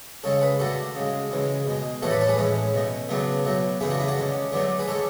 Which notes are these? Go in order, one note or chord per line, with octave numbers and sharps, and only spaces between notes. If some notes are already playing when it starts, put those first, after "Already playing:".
C#3 G#3 A4 C#5
G#4 B4
D3 A3 F#4 A4
C#3 G#3
C#3 E3 G#3
B2 G#3
A2 E3 A3 F#4 A4
B4 D5
A4 C#5
G#4 B4
A2 E3 G#3 C#4
B2 A3
C#3 F#3 A3 B3 D4
B2 F#3 A3
C#3 E3 A3 E4 G#4
D4 F#4
E4 G#4
D4 F#4
D3 G#3 C#4
D3 F#3 A3 B3 D4
G#4 B4
D3 G#3 A4 C#5